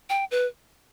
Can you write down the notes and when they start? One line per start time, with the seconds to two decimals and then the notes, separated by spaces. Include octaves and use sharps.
0.09 G5
0.31 B4